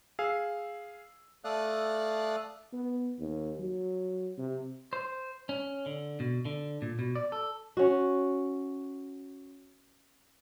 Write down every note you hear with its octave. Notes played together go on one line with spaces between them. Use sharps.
G#4 F5 E6
A3 A4 D5 F5 D#6 F#6
B3
D#2
F#3
C3
C5
C#4
D3
B2
D3
A#2
B2
D5
A4
C#4 F#4